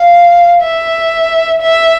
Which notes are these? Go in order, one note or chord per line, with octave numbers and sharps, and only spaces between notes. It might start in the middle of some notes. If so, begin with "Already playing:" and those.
Already playing: F5
E5
E5